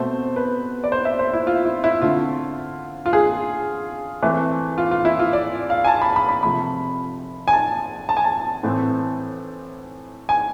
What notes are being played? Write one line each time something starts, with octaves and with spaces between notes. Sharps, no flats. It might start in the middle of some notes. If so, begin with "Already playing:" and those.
Already playing: B2 A3 C4 C5
B4
D5
C5
E5
C5
E4
F4
E4
E4
D3 A3 C4 F4
F4
G#4
E3 A3 C4
F4
F4
E4
F4
D5
F5
G#5
A5
B5
B5
B5
C3 F3 A3 B5
G#5
A5
A5
G#5
A5
A2 E3 A3 C4
G#5